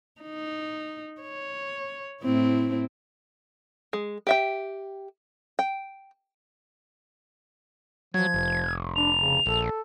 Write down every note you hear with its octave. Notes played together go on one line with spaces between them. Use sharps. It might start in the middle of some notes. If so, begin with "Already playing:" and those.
D#4
C#5
A2 C4 E4
G#3
G4 E5 G5
G5
F3 F#3 G#6
F1
D4 F7
C#3
A#1 A4